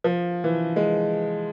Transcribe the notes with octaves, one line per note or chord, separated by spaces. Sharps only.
F3
E3
G#3